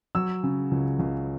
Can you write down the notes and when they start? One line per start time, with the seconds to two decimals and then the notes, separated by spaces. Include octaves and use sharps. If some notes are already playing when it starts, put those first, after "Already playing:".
0.15 F#3 E6
0.43 C#3
0.71 C#2
0.99 C#2